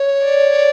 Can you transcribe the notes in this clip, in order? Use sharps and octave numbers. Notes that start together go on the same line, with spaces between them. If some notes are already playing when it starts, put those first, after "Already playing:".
Already playing: C#5
D5